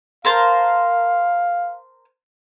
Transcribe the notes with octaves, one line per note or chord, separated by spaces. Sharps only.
A#4 C5 F5 A5